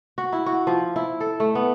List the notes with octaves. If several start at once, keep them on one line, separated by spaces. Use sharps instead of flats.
F#4
E4
F#4
F3
E4
A4
A3
B3